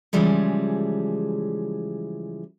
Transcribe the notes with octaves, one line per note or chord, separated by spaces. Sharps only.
C#3 E3 F3 G3 G#3